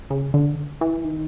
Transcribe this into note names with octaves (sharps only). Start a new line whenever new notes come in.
C#3
D3
E3
D#3